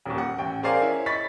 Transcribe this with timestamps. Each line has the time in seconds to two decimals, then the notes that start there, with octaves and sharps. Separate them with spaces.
0.05 D#1 D#2
0.18 F#5
0.38 A1 G5
0.63 G#4 A#4 C5 D5 F5 G#5
0.82 C#4 E4
1.06 D#5 B5 C#6 A6 B6